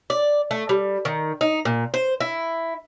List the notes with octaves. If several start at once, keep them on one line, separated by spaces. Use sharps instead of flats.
D5
A3
G3
D#3
D#4
A#2
C5
E4